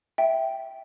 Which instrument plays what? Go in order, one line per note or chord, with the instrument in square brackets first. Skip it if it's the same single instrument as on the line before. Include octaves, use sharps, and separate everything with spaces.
[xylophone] E5 G5